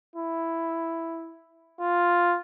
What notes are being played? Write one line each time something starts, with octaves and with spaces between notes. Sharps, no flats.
E4
F4